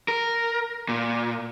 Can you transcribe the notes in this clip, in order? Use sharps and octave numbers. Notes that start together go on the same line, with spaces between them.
A#4
A#2